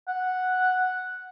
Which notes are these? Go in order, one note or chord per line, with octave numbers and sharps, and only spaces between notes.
F#5